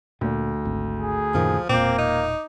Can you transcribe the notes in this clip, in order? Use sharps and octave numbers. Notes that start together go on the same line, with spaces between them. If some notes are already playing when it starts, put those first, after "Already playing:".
D2 A#2
G#1
G#4
F#2 A#2 D#3 F3
E1 A#2 A#3 C4 D6 G6
D#4